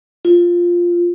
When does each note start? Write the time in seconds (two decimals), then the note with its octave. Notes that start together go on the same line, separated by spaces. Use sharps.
0.25 F4